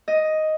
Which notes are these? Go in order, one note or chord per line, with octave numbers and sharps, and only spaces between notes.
D#5